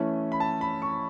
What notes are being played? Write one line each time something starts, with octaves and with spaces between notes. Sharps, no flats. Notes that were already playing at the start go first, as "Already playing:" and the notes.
Already playing: E3 A3 C#4
B5
A5
B5
C#6